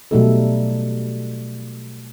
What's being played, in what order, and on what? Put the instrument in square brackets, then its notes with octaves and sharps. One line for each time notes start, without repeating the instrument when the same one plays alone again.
[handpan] B2 F#3 G3 A3 D#4 A4